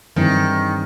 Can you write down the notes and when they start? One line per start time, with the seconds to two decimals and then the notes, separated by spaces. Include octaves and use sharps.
0.16 G2 D#3 E3 G#3 C4 D#4